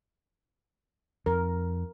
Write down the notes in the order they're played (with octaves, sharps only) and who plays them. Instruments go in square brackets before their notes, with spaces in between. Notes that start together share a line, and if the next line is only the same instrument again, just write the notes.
[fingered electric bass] F2 [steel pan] A#4